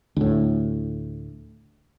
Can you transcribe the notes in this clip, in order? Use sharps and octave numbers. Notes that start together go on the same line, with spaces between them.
D2 A2